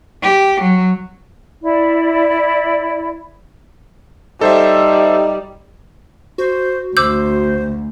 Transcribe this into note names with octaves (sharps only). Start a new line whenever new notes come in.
G4
F#3
E4 D5
G3 D#4 A4 C5 E5
F#4 C5
D2 C5 D6 E6 G6